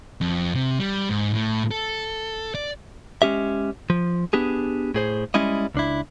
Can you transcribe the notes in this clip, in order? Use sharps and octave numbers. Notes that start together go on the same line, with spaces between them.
F2
C3
G3
G#2
A2
A4
D5
G#3 C#4 G4 E5
F3
B3 D4 G4 G#4
A2 G#4 C5
G3 G#3 C#4 E4 D#5
C#2 D4 E4